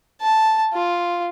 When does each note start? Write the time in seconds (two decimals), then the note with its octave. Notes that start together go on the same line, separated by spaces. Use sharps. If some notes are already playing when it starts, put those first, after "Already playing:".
0.21 A5
0.73 F4